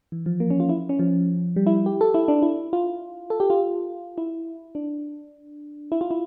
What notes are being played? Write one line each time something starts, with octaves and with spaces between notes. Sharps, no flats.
E3
F3
A#3
C#4
F4
E4
C#4
F3
G3
E4
G4
A4
E4
D4
E4
F4
A4
G4
F4
E4
D4
E4
F4
E4